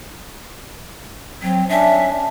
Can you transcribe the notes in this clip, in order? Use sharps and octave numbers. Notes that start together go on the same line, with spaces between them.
F#3 C4
C#4 D4 E5